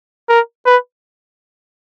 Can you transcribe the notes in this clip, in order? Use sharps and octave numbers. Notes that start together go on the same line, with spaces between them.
A#4
B4